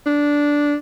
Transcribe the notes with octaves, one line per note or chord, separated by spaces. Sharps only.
D4